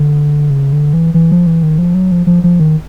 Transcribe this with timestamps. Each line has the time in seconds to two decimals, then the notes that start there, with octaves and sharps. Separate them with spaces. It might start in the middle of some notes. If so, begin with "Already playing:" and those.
Already playing: D3
0.50 C#3
0.73 D3
0.93 E3
1.14 E3
1.32 F3
1.47 E3
1.63 D#3
1.78 F3
1.94 F#3
2.12 F3
2.27 F3
2.44 F3
2.60 D#3